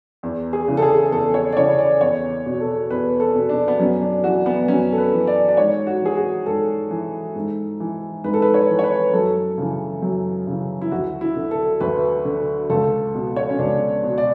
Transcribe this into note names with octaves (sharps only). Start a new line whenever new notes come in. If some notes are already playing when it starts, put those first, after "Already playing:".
E2
G#4
C#3 E3
A4
G#4
E2 A4
C#5
D5
C#3 E3 C#5
D5
E2 C#5
B2
A4
E2 B4
A4
B2
D4
B3
F#2 C#4
D4
E3 F#4
B3
F#2 C#4
A4
B4
E3
D5
D5
G#2 C#5
F#4
E3 G#4
F#4
G#2 A4
E3
G#2
E3
G#2 B4
A4
B4
C#5
E3
C#5
B4
F#2 A4
C#3 E3
F#2
C#3 E3
E4
D2 F#4
E4
D3
A4
D2 B4
D3
C#2 A4
B2
C#5
C#4
C#2 D4
B2
D5